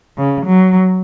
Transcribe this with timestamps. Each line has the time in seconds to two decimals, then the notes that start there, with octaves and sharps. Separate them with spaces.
0.18 C#3
0.46 F#3